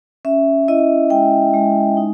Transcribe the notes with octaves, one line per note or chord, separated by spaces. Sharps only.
C#4 E5
E4 D#5
G#3 G5
G#3
D#4